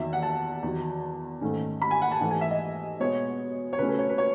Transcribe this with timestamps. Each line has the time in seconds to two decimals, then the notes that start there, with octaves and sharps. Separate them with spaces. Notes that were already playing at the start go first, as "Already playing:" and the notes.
Already playing: E2 D#3 F#3 E5
0.13 F#5
0.23 A5
0.63 E2 D#3 F#3
1.41 G#2 D#3 A3 C#4
1.82 B5
1.91 G#5
2.02 F#5
2.11 A5
2.20 G#2 E3 A3
2.31 G#5
2.41 E5
2.51 D#5
3.00 B2 G#3 B3 C#5
3.73 C#5
3.79 C#3 F#3 A3 C#4 B4
3.89 B4
3.99 C#5
4.09 B4
4.18 C#5